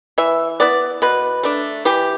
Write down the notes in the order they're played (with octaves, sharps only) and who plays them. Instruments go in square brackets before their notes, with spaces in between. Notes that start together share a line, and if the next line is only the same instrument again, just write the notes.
[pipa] E3 E5
B3 E4 D5
B2 B4
A3 D4
E3 G4